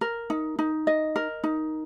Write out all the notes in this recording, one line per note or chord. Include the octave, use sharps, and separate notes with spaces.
A#4
D#4
D#4
D#5
A#4
D#4